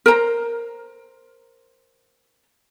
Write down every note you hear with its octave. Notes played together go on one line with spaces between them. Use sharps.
A#4 C5 A#5